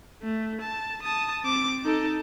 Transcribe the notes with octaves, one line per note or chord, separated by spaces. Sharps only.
A3
A5
A5 D#6
C4 D6
D#4 A4